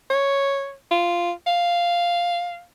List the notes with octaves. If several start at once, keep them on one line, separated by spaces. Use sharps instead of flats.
C#5
F4
F5